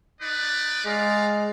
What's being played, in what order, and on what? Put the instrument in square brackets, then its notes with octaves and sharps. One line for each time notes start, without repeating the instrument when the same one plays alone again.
[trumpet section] D#4 B4 D5
[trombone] G#3 [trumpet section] D5 F5 A#5